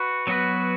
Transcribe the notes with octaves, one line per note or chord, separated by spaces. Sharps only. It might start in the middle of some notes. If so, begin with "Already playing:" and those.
Already playing: F#4 B4
F#3 B3 F#4 B4